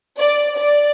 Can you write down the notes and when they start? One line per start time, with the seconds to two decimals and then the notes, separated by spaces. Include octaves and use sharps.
0.20 D5
0.59 D5